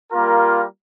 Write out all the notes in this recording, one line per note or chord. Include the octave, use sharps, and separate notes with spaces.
G3 A#3 F4 A#4